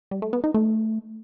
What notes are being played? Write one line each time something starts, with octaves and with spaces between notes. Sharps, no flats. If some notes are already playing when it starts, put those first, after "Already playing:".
G3
A3
B3
D#4
A3